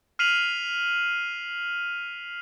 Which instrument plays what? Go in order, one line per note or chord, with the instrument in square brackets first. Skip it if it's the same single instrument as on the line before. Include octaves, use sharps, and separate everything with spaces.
[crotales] F6 B6 C7 D#7 F7 F#7